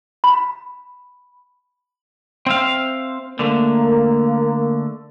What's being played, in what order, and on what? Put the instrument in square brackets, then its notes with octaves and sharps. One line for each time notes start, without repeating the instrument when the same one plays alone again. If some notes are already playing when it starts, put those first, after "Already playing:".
[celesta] B5
[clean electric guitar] C4 E5 F5
[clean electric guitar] D3 A3 [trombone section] A#3